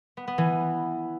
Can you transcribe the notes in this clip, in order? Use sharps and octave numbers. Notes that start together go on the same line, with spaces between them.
B3
B3
E3